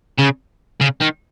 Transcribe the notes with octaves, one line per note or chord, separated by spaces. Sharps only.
C#3
C#3
D#3